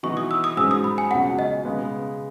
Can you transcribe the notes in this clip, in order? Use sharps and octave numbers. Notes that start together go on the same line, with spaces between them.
E3 B3 D#4 F#4 C#6
D#6
E6
D#6
G#2 F#3 C#4 G#4 E6
D#6
B5
G#5
C#2 B2 F#3 C#4 F#5
D#5
C#3 G#3 B3